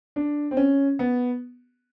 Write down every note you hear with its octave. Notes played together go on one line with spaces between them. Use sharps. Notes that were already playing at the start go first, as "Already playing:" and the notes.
D4
C4
C#4
B3